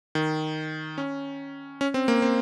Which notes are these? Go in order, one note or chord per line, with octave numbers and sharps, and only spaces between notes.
D#3
C#4
C#4
C4
A#3
C4